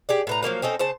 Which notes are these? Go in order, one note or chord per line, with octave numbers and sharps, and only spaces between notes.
G4 G#4 D5
A2 B4 A#5
F3 F#3 A#3 F5
C4 C#4 D#4 A4
C#3 C5 A5